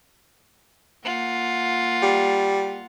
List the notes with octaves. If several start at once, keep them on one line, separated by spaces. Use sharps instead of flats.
A#3 F4 F#5
G3